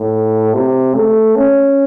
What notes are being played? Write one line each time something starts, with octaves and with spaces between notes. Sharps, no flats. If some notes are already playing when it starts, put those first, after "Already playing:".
Already playing: A2
C3
A3
C#4